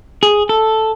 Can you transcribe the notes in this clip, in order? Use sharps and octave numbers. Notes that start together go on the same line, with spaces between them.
G#4
A4